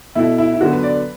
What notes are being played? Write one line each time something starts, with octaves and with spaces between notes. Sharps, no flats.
B2 A3 E4
E4
E4
D3 F#3 B3 F#4
B4
D5
B4